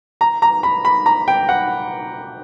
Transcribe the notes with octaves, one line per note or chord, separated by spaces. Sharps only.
A#5
A#5
B5
B5
A#5
G5
F#5